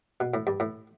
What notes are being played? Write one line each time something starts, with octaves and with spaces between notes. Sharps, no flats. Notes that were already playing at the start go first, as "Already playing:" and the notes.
B2
A2
G2
A2